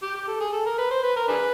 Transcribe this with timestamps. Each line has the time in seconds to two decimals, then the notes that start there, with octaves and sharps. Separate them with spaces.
0.03 G4
0.16 G4
0.28 A4
0.41 G#4
0.53 A4
0.66 A#4
0.79 B4
0.91 C5
1.04 B4
1.17 A#4
1.29 D4 G#4 B4